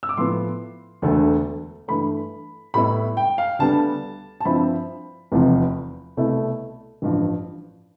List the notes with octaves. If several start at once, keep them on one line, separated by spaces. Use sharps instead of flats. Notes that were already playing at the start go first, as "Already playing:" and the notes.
E6
D6
A2 F3 B3 C6
E1 D2 D3 A3
G2 E3 A3 B5
A2 G3 B3 E4 B5
G5
F5
D2 D3 G3 B3 A5
A5
G2 F3 C4 E4 B5
F1 E2 C3 F3
C2 B2 A3 E4
A1 G2 F3